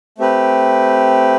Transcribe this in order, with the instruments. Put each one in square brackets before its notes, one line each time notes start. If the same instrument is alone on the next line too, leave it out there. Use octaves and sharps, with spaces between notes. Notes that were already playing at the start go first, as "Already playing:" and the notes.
[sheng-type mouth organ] A3 C4 G4 B4